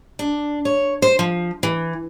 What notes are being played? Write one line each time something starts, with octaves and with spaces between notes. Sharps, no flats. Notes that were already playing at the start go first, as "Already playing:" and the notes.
D4
C#5
C5
F3
E3